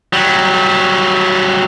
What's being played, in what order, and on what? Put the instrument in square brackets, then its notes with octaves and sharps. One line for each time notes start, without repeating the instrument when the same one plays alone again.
[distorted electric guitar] F#3 G3